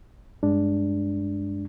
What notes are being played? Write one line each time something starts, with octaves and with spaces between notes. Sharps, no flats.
G2 G#3 D4